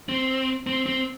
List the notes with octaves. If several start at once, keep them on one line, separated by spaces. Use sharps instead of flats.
C4
C4
C4